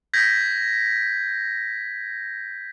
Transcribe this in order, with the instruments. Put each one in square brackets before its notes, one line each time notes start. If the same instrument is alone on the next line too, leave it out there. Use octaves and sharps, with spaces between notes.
[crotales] G6 G#6 A#6 B6